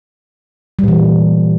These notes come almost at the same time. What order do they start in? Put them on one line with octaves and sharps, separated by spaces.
G3 A#2 E3